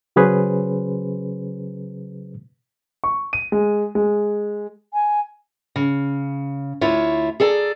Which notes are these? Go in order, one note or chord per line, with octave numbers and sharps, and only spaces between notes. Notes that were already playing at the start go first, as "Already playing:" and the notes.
C#3 F#3 C#4 G#4 B4 C5
C#6
D#7
G#3
G#3
G#5
C#3
D2 E4 F4 C#5
G#4 A4 D5 F#5 A#5